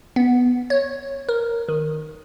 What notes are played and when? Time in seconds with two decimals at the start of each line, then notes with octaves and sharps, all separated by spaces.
0.16 B3
0.70 C#5
1.29 A#4
1.69 D#3